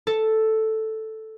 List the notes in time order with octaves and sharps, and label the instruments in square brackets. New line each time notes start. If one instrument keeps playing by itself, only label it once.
[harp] A4